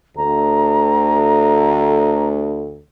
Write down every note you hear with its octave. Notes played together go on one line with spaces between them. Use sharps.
D2 A4 A#5